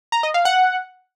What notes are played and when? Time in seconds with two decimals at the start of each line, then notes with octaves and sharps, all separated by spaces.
0.12 A#5
0.23 D#5
0.34 F5
0.45 F#5